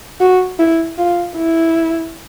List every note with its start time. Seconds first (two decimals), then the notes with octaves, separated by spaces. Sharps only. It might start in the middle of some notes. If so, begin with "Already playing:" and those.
0.20 F#4
0.59 E4
0.98 F4
1.37 E4